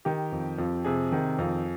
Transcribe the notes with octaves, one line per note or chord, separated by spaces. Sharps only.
D#3 G4
F2
F2
C3 G#4
D#3
F2